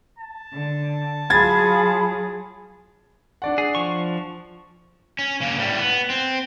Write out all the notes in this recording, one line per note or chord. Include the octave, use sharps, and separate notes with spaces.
A5
D3
F#3 F4 G#4 B5 G#6 A6
D4 D5 F#5
G#4
F3 C#6
C#4
C#3 A#3
A2 G3
B3
C4